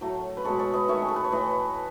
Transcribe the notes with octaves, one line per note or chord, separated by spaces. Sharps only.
A2 F#3 A3
B4
B2 G#3 A4 C#5
A4 C#5
B4 D#5
D#3 A3 C#5 E5
G#4
A4
B4
C#5
A2 E3 A3 B4 D#5